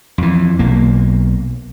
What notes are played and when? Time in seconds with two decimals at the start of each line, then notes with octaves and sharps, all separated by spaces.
0.18 F2 E3
0.59 B1 A#3